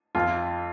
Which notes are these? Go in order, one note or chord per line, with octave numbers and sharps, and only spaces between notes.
F2 F4